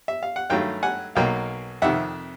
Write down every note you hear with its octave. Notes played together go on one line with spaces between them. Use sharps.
E5
F5
F#5
G2 D#3 F#3 A3 F5 G5
F#5 G#5
B1 B2 F#3 A#3 F5 G5
F2 C3 D#3 E5 F#5